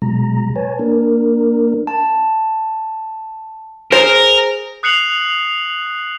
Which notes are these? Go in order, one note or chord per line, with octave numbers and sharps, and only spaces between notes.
B2 F#3 G#3 A#5
B4 C#5 G#5 A5
A#3 D4 A#4
A5
G#4 A#4 C5
D#6 F#6 C7 C#7 F7 F#7